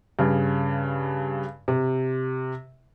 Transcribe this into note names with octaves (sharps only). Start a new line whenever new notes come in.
G2 C#3
C3